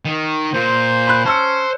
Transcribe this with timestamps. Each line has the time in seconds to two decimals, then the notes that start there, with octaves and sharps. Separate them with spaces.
0.05 D#3 D#4
0.54 A#2 C5
1.07 B5 F#6
1.26 C#4 C5 A5 E6 C#7